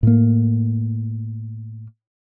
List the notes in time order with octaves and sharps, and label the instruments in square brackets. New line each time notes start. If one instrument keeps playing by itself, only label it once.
[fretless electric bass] A2 A#3